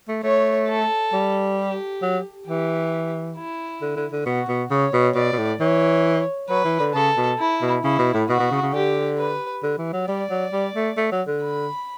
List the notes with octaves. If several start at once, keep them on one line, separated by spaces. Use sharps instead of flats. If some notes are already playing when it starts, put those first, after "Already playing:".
A3
A3 C#5
A4
G3
G4
F#3
E3 G4
E4
D3
D3
D3
B2 F#4
B2
C#3 C#5
B2
B2 D5
B2
A2
E3 C#5
F#3 B4
E3
D3
C#3 A4
B2
E4
B2
C#3 E4
B2
A2
B2 F#4
B2
C#3
C#3
D3 G4
B4
D3
E3
F#3
G3 D5
F#3
G3
A3
A3
F#3
D3
B5